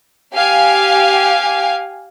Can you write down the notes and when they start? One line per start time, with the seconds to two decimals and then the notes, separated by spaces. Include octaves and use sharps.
0.34 G4 F5 G#5